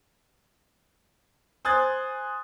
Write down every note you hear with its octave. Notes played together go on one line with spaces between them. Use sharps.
C5 G#5 D#6 F#6 G#6 A6